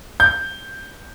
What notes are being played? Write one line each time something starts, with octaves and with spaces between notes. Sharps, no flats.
G6